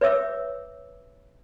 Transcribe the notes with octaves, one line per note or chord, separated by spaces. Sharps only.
B4 C#5 E5 D6 E6